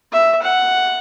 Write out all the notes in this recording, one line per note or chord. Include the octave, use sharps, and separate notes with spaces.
E5
F#5